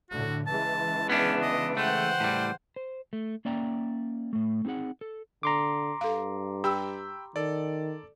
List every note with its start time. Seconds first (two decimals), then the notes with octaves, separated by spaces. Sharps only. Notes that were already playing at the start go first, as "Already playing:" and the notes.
0.10 A2 D3 F#4
0.47 C#3 E3 G#3 A5
1.09 B3 C#4 D4
1.42 D#5
1.77 A3 C5 F#5 G5
2.20 A2 G3
2.76 C5
3.13 A3
3.45 A#3 C#4 D5 E5 G5 A#5
4.33 A2 A3
4.65 C4 D#4 G4 G#4 F#5
5.01 A4
5.43 D3 A#5 C6 D6
6.01 G2 A4 F5
6.64 G4 G5 B5 E6
7.36 D#3 A4 D5